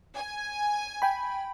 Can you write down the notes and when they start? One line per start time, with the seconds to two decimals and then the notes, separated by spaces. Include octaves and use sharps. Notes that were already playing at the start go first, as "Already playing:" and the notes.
0.15 G#5
1.02 G5 B5